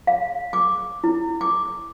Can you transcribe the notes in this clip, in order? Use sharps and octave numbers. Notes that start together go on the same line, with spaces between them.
F5
D6
E4
D6